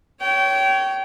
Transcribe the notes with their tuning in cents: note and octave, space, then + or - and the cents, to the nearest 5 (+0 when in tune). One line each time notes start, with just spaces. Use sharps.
C#5 +10 G5 -25